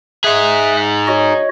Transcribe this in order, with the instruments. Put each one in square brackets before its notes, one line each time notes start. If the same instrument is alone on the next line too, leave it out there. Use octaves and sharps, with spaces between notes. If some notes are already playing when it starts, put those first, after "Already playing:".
[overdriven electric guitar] D#4 G#4 [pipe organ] E5 D#6 F#6
[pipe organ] F#4 C#5 D#5